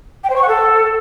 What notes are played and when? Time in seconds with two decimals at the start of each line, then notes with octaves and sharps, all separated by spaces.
0.24 G5
0.30 C5
0.36 C#6
0.42 F#5
0.48 A4